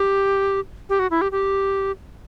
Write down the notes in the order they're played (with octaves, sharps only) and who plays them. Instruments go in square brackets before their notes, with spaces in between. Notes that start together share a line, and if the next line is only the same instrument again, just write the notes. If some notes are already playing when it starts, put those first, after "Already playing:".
Already playing: [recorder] G4
G4
F#4
E4
G4
G4